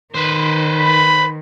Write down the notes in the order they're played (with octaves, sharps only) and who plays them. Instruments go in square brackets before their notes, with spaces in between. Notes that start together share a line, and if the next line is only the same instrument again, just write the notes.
[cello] D#3 [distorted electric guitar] B4 C5
[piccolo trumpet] B5